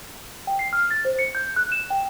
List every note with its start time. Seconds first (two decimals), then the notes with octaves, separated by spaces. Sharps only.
0.47 G5
0.59 C7
0.73 F6
0.91 A6
1.05 C5
1.19 C#7
1.35 G6
1.56 F#6
1.72 E7
1.90 G5